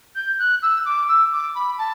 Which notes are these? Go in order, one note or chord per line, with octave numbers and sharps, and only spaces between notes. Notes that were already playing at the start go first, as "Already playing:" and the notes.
G6
F#6
E6
D6
E6
D6
B5
A5